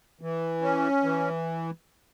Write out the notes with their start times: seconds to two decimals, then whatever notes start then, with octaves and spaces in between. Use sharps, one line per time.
0.21 E3
0.62 C#4
1.03 E3